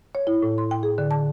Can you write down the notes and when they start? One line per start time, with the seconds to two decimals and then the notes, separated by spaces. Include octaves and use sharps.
0.15 C#5
0.27 E4
0.42 A2
0.58 C6
0.71 G5
0.83 G#4
0.98 D3
1.11 A5